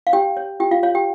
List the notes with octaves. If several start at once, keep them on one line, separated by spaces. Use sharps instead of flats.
F5
G4 C#5 G5
C#5
F4 G4 G5
F4 F5
F4 C#5 F5
G4 G5